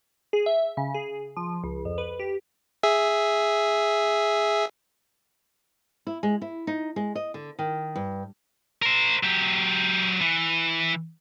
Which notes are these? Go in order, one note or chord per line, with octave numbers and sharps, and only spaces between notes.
G#4
E5
C#3
G#4
F3
C#2
F2
B4
G4
G#4 E5
E4
G#3
E4
D#4
G#3
D#5
D3
D#3
G2
A#4 C5
F#3 G4
E3